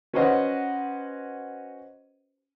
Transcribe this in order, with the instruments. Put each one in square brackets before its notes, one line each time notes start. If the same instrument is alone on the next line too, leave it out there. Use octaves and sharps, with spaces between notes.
[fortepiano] C#4 F#4 B4 C5 D#5 F#5